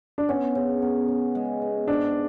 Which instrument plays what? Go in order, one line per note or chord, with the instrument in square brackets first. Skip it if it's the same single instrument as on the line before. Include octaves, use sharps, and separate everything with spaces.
[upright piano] D4
[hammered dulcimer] B3 [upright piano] C#4
[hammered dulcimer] C#3
B3
C#3
G#3
B3
[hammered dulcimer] G#2 [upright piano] D4